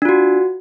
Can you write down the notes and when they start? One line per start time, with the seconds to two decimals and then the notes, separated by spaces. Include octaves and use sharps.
0.02 D4
0.05 F4
0.09 F#4